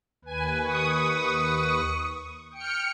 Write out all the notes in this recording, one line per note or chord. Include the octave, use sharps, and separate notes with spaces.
D#2 B4 G#5
C#6 D#6
G5 F6 C#7